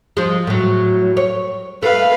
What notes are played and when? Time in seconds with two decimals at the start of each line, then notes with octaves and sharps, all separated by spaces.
0.17 F3 G#3
0.47 A2 F#3
1.17 C#5
1.83 A3 B4 F5